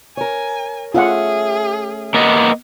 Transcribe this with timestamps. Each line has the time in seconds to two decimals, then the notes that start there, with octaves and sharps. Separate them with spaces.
0.17 A#4 C#5 G#5
0.94 A3 C#4 F4 G#4 F#5
2.14 A#3 B3 D#5